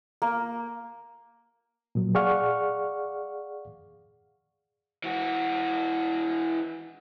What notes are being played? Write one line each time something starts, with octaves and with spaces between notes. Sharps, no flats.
A#3
A#2 F#3
G#4 D5 F5 F#5 C#6 F6
E3 F#4